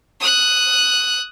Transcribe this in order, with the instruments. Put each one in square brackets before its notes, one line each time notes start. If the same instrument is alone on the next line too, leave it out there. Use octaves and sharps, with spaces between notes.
[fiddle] D#6 F#6